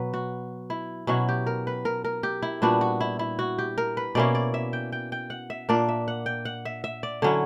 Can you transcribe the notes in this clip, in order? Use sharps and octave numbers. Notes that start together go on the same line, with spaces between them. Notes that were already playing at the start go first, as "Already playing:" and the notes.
Already playing: B2 F#3 B4
F#4
E4
B2 F#3 C#4 E4 F#4
G4
A#4
B4
A#4
A#4
G4
E4
A#2 G3 B3 D4 F#4
F#4
E4
E4
F#4
G4
A#4
B4
B2 A#3 C#4 E4 D5
D5
E5
G5
G5
G5
F#5
E5
A#2 A#3 D4 D5
E5
F#5
G5
F#5
E5
E5
D5
D3 F#3 C#4 E4 C#5